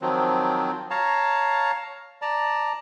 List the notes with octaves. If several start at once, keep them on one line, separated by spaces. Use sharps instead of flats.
D#3 F3 F#3 C4
C#5 F5 A5 A#5
D5 A5 A#5